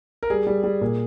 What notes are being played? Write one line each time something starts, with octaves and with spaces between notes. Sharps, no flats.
A#4
G3 G#4
G3
G3
A#2